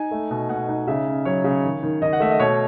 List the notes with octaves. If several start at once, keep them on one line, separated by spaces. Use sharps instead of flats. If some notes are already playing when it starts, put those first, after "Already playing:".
Already playing: D#4 G#5
A3
B2
B2 F#5
D#4
C#3 E5
C#4
F#3 C#5
C#3
D#3
D#3
D#3 D#5
F#5
A3 E5
D#5
B2 C#5